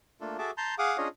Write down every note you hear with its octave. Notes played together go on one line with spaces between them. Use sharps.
A3 A#3 D4 F4 A4
F#4 G#4 A4 E5 A5 D6
A5 A#5 C6 G6
G#4 F5 F#5 D6 D#6
C#4 D4 F4 G#4 C#5 D#5